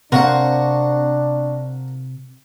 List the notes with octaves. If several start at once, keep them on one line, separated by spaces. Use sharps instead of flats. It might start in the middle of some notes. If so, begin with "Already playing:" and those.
C3 C4 D4 F#4 A#4 F5 F#5